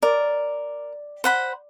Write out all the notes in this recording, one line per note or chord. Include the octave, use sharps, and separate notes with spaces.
A#4 D5
C5 F#5 B5